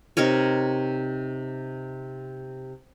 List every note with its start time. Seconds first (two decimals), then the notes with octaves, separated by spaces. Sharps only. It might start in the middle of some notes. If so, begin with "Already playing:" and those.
0.17 C3 D#4 A#4 C#5